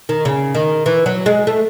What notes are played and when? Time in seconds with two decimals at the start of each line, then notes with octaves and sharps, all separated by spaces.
0.09 D#3
0.25 C#3
0.55 D#3
0.86 E3
1.06 F#3
1.26 G#3
1.47 A3